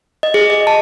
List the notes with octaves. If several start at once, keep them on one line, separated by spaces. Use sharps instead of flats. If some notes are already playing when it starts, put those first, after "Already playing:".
D#5
G#4
D#5
A5